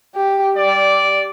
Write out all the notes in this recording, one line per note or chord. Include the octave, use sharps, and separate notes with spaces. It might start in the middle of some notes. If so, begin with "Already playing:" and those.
G4
G3 D5